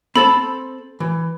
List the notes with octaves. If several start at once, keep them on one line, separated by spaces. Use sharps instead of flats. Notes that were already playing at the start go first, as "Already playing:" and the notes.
C4 A4 A5 B5
E3